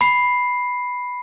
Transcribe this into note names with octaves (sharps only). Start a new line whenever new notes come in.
B5 C7